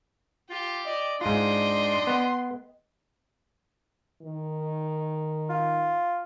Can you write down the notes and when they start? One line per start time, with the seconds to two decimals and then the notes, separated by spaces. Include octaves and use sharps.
0.50 F4 G4
0.86 D5 D#5
1.21 G#2 D4 F4 D#5 G5 C6
2.07 B3
4.22 D#3
5.49 F4